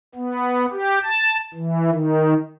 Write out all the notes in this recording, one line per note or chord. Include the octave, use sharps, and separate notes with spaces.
B3
G4
A5
E3
D#3